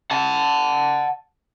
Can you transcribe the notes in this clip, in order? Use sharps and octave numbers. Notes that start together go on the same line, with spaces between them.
F#5 A5